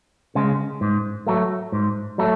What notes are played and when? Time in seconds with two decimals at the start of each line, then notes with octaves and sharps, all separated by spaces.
0.35 C#3 G#3
0.81 G#2
1.27 F#3 A3
1.72 G#2
2.18 F#3 A3